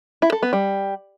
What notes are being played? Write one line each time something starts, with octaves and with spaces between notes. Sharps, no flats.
E4
A4
B3
G3